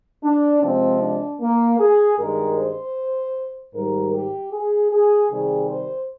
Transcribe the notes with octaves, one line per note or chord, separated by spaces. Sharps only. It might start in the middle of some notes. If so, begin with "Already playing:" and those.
D4
C3 F3 G#3 C4
D4
A#3
G#4
G2 D#3 G#3 A#4
C5
G#2 D#3 G3 A#4
G4
G#4
G#4
C3 D#3 G3 G#4
C5